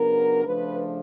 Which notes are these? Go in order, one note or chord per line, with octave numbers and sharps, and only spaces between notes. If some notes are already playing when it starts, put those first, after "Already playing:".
Already playing: C#3 F#3 B3 D4 A#4
C#3 F3 A3 D4 B4